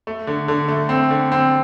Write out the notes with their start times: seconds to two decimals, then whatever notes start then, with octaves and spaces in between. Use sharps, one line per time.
0.07 A3
0.27 D3
0.48 D3
0.68 A3
0.89 C4
1.10 D3
1.32 C4